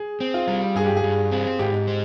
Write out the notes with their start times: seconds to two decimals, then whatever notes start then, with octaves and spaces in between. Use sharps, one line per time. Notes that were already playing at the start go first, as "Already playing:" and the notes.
Already playing: G#4
0.20 C4
0.34 F4
0.48 G3
0.75 G2 G#4
0.86 G4
0.96 G#4
1.04 G2
1.32 C4
1.59 G#2 G4
1.87 G#3